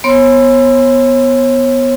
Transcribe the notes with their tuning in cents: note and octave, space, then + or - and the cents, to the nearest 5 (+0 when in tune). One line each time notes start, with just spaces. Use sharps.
B3 +0 C#5 -35 C6 +0